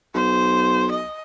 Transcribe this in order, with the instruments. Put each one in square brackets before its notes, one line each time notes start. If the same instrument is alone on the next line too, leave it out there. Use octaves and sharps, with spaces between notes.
[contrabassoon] B1 [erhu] C5
[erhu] D#5